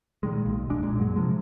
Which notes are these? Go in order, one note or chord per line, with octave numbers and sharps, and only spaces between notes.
A#2 D#3 G#3
B1
D#1 G#3 D4
A#2 G#3
F#2 F#3 G#3
C3 F3 G#3